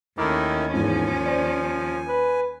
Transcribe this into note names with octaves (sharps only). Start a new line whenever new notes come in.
D#2 D#3 A3 C#4 E4 A#4 D6
E2 G#2 F3 G#5
C5 D5
B4